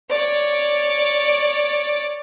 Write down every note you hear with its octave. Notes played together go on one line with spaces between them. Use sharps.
C#5 D5